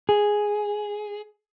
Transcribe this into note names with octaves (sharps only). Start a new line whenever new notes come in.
G#4